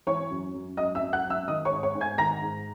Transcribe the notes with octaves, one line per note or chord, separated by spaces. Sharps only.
E3 C#5 C#6
F#2
F#2
F#2 D#5 D#6
E5 E6
F#2
F#5 F#6
F#2
E5 E6
D#3 D#5 D#6
C#5 C#6
G#2
C#5 C#6
G#2
G#5 G#6
D#3 A#5 A#6
G#2